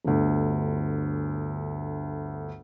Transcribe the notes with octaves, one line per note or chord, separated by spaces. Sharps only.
G1 D2